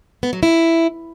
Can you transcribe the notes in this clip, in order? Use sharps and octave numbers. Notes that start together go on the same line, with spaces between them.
B3
F#3
E4